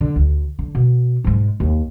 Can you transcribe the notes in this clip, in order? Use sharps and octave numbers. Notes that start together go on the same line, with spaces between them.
D3
D2
D3
B2
G#2 G#3
D#2